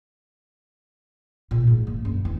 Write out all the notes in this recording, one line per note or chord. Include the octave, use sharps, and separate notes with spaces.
A#2
G#2
A#3
F#2
E2